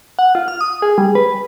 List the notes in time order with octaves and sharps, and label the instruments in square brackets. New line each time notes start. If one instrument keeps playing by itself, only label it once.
[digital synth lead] F#5
F4
F6
D#6
G#4
G3
B4